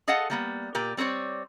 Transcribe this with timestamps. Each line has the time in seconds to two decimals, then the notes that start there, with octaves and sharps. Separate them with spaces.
0.07 G#4 A4 D#5 F5 F#5 A5
0.30 G3 A#3 B3
0.75 A#2 G4 A#4
0.97 G3 C4 A4 C#5 D5